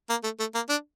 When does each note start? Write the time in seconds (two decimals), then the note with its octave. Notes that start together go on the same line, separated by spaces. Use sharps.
0.10 A#3
0.24 A3
0.39 A3
0.55 A#3
0.69 D4